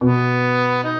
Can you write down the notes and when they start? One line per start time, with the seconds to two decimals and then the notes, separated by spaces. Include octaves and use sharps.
0.01 B2 B3
0.83 D#4